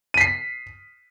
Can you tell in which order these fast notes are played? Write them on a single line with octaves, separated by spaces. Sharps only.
D#7 B6 C7